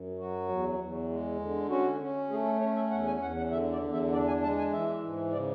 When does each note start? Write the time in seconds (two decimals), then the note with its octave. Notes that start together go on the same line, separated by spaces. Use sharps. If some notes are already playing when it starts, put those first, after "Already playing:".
Already playing: F#2
0.19 F#3 F#4
0.48 E2
0.79 E2
1.09 G#3
1.39 D3
1.69 C#4 F#4
2.00 C#4
2.30 A3 G#4
2.45 A4
2.60 C#4 C#5
2.76 E5
2.90 E2 F#5
3.07 G#5
3.21 E2 F#5
3.37 F#5
3.51 D3 E5
3.72 D5
3.82 E2
3.92 E5
4.12 D4 D5
4.27 G#5
4.43 G#3 A5
4.58 G#5
4.73 E3 E5
5.04 G#2
5.33 C#3 D5